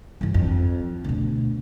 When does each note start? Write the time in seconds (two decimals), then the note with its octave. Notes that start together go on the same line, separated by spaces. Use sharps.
0.21 G1 E3
0.34 F2
1.04 D2 B2